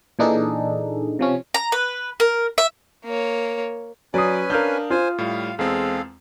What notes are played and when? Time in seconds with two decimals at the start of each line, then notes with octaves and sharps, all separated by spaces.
0.19 A#2 E3 D4 D#4 G#4 A4
1.19 C3 F3 C#4
1.54 A#5
1.72 B4
2.20 A#4
2.58 E5
3.04 A#3 C#5
4.14 F#3 C#4 B4 D5 G#5 D#6 C7
4.50 D4 A#4 F5 F6 G6
4.90 F4 C5 G#5
5.18 A2 G3 F5
5.59 E2 G#3 C4 G#4 A4 F5